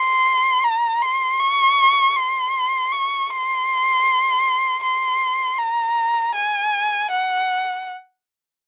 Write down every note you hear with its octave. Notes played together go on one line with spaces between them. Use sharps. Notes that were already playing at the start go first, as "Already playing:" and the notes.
Already playing: C6
A#5
C6
C#6
C6
C#6
C6
C6
A#5
G#5
F#5